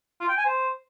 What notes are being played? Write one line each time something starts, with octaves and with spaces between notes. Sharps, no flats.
F4
G5
G#5
C5